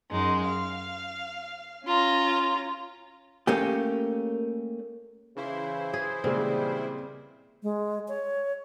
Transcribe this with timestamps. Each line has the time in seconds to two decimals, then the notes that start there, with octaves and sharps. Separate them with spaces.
0.11 F#2 G#3 D#4
0.45 F5
1.86 C#4 F4 A#5
3.47 A3 A#3 C#4 G4
5.37 C#3 E3 E4 C5
5.93 G#4
6.24 A#2 C#3 G3 G#3 C4
7.63 G#3
8.08 C#5